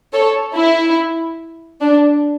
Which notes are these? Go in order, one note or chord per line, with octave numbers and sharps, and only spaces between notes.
A4 C#5
E4
D4